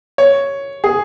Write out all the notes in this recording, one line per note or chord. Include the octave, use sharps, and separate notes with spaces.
C#5
G#4